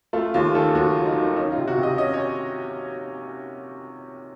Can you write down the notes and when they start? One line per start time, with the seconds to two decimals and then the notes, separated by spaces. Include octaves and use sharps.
0.13 A3 F4
0.34 D#2 F4
0.55 D#3 A4
0.75 D#2 F#4
0.90 F4
0.96 F#3
1.06 D#4
1.16 D#3
1.36 C#4 D#4
1.52 F4
1.58 C3
1.68 F#4
1.78 C3
1.83 D#5
1.98 C#4 D#5
2.14 C#5